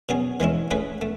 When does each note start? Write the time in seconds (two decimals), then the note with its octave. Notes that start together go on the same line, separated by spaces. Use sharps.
0.09 B2 F#3 C#4 G#4
0.40 E3 G#3 C#4 E4
0.71 A3 C#4 G#4 B4
1.01 A3